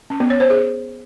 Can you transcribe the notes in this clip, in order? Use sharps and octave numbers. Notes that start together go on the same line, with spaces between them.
C#4
B3
C#5
C5
G#4